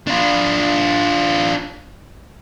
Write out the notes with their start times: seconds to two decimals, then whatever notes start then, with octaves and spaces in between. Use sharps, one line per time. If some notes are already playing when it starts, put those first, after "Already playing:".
0.07 D4 F4